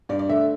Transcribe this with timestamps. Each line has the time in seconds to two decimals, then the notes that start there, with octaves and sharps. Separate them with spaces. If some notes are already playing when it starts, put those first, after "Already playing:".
0.09 G2 D5
0.19 D5
0.29 D3 A3 E5